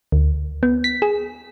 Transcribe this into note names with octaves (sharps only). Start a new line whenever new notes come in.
D2
B3
B6
G#4